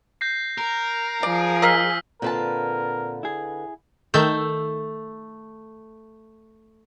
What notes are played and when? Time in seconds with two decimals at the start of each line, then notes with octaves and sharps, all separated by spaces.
0.21 G6 A#6 C7
0.58 A#4
1.23 F3 G#4 D5
1.62 A#4 D#5 F5 E6 F6 B6
2.22 A#2 D3 C4 F4 A#4 B4 A5
3.23 E4 G#4
4.14 D#3 A3 E6 G6